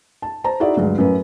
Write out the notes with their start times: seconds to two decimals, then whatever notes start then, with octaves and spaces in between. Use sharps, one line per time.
0.22 A5
0.44 C5 A5 A#5
0.60 D#4 E4 F#4 G#4 D5 E5
0.76 D2 G2 F#3 G#3
0.98 F#2 A2 F#3 B4